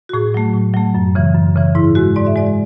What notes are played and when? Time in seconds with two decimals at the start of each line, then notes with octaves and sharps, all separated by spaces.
0.09 F#4
0.13 A2 G#4
0.34 F#3 A3
0.54 A2
0.74 F#3 A3
0.95 F#2
1.15 C#3 E3
1.35 F#2
1.56 C#3 E3
1.75 G#2 E4
1.95 G#3 F#4
2.16 G#2 D5
2.27 E5
2.36 G#3 D5